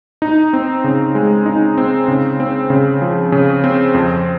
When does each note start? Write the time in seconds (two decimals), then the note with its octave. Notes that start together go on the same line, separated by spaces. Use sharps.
0.22 D#4
0.53 C4
0.84 C#3
1.15 G#3
1.46 D#4
1.78 C4
2.08 C#3
2.40 C4
2.70 C#3
3.02 F3
3.32 C#3
3.64 C4
3.94 F2